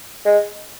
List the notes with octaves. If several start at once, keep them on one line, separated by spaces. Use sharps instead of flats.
G#3